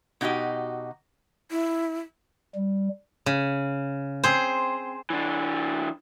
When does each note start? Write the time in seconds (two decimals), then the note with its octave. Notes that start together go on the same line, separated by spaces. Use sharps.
0.21 B2 D#4 F#4 G4 D#5
1.51 E4
2.55 G3
3.26 C#3
4.24 C4 G#4 C5
5.10 E3 D4